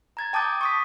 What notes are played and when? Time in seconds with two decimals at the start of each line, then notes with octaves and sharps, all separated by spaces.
0.17 A#5 G#6 A6
0.33 G5 A5 D6 D#6 G6 A6
0.61 C#6 D#6 B6